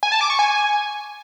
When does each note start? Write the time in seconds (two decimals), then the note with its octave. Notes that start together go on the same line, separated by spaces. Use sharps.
0.03 G#5
0.12 A5
0.21 D6
0.30 C#6
0.39 G#5